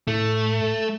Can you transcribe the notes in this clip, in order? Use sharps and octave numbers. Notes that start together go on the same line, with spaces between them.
A2 A3